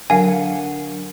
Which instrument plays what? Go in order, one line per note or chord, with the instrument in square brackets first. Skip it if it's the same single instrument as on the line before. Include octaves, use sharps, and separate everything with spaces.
[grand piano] D3 [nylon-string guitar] F#3 A#4 F#5 [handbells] F5 G#5